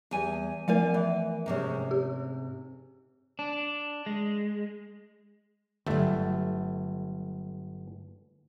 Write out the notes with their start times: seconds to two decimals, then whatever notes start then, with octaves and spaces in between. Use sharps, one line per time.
0.11 E2 G3 G#5
0.68 F3 A3 A#4 D5 F5 G#5
0.94 E3
1.46 G#2 C3 C#4
1.91 G4
3.39 D4
4.06 G#3
5.86 G1 G2 F#3 A3